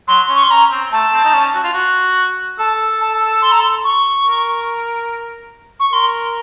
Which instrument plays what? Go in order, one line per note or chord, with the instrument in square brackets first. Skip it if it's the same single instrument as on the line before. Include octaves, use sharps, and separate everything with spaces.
[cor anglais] F#3 [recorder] C6
[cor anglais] C#4
[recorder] C#6
C6
[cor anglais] C#4 [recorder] A#5
[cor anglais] C4
[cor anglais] A3 [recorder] A5
[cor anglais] C4
D#4
C#4
F#4
F4
F#4
[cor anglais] A4 [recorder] A5
[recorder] A5
C6
A#5
C6
C#6
[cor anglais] A#4
[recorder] C#6
[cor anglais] A#4 [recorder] C6